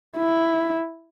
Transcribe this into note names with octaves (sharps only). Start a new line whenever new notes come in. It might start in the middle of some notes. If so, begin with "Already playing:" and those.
E4